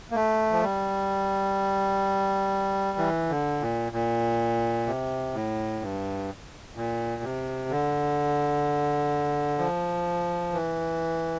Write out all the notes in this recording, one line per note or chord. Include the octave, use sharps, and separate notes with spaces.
A#3
A3
F3
G3
E3
D3
A#2
A#2
C3
A2
G2
A#2
C3
D3
F3
E3